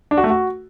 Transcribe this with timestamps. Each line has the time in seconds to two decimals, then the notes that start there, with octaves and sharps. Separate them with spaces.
0.11 D4
0.17 F#4
0.24 A3
0.30 F#4